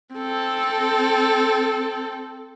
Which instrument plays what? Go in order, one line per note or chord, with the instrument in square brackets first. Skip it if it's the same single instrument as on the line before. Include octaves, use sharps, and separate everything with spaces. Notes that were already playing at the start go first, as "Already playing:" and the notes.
[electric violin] C4 A4